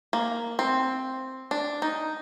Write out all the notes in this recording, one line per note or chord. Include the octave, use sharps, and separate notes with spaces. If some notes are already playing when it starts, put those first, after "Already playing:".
A#3
C4
D4
D#4